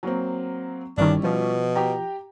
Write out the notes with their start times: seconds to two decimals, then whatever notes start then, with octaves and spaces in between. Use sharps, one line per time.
0.03 F#3 A#3 C4
0.98 G1 D#3 G3 C#4 D4 E4
1.23 B2 F3
1.76 G4 G5 A#5